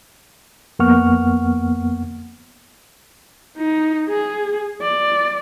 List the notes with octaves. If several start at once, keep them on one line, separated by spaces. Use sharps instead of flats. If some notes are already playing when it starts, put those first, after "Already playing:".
F2 A#3 B3 F#5 C#6 F6
D#4
G#4
D5